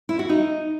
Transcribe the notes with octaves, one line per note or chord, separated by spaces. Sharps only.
E4
F#4
D#4